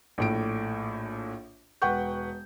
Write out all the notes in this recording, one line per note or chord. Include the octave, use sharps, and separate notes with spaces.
A#1 A2 D7
E1 B4 F#5 G5 C#6 G6